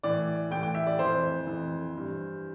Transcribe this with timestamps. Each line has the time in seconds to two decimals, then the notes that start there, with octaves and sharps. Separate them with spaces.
0.03 A2 E3 D5
0.51 A2 E3 G5
0.63 G5
0.75 E5
0.87 D5
0.99 F2 E3 C5
1.47 F2 E3
1.94 G2 E3